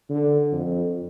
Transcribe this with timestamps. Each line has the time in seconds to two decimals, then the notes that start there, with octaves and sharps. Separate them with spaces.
0.10 D3
0.52 F2